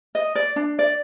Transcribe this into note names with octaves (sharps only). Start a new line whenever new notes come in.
D#5
D5
D4
D5